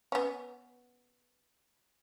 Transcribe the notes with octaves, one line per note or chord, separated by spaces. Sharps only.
B3 C#4